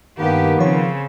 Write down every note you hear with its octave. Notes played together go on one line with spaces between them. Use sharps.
G2 D#3 A#3 B3 G4
C#3 F3 C4 C#5